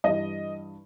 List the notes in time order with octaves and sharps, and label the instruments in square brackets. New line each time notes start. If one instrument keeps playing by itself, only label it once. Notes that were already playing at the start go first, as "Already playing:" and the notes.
[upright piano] G2 E3 G3 D#5